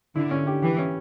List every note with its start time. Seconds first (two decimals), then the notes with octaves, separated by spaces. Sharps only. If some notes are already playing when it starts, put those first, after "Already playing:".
0.15 D3 E4
0.31 C#4
0.47 G4
0.62 E3 G4
0.78 C#4